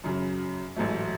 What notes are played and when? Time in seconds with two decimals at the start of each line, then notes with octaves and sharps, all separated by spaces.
0.04 F#2 C#3 F#3
0.77 A1 G#2 F#3 A3